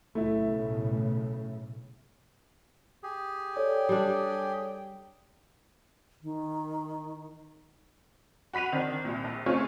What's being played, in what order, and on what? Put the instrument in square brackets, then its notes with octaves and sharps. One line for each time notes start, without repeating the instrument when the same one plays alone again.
[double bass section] B1 A2 C#3 [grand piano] A3 E4 E5
[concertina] G4 G#4
[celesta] A4 C#5 D5 [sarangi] G5
[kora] G3 D4
[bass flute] D#3
[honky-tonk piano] F#4 B5 B6 D#7 F7
D#3 C4 D4
C2 A#2
A#1
A3 C4 C#4 F4 G#4 C#5